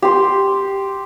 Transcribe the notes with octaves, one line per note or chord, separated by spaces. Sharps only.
G4 C6